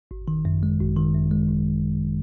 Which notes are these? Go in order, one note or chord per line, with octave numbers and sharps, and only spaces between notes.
G#1
D#3
F#2
G#3
G#1
D#3
F#2
G#3
G#1